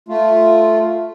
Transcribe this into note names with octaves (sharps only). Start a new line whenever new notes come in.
A3 F4